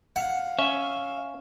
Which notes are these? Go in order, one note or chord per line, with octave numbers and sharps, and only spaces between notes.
F5 F#5
C#4 E5